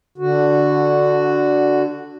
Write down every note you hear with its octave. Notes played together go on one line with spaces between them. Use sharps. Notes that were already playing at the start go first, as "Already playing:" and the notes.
D3 F#4